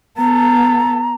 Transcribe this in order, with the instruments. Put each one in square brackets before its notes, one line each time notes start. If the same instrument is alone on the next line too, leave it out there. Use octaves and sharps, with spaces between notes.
[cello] B3 A4 [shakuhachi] A#5